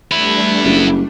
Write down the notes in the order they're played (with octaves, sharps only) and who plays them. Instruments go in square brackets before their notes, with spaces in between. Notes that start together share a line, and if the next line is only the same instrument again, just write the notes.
[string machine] G3 A3 D4 [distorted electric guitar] B3 E4
[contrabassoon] F#1